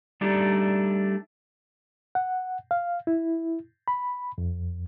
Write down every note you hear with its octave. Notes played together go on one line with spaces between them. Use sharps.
G3 A3 D4 D#4 G4
F#5
F5
E4
B5
F2